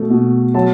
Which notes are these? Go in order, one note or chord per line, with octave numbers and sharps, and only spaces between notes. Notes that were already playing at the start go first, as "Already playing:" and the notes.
Already playing: B2 A3
B2
F#3 A5